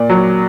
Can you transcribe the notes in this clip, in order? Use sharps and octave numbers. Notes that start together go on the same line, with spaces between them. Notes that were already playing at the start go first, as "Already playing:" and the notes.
Already playing: A#2 D5
F#3